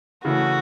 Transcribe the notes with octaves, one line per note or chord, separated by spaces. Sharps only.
C#3 E3 A3 C#4 F#4